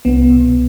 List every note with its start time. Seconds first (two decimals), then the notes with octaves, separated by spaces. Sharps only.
0.05 C2 B3
0.30 B2